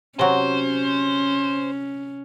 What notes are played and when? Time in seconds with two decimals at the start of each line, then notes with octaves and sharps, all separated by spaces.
0.19 C3 F#3 C#4 C5